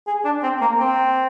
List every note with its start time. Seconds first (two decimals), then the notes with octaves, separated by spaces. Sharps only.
0.07 G#4
0.24 D4
0.43 C4
0.61 A#3
0.80 C4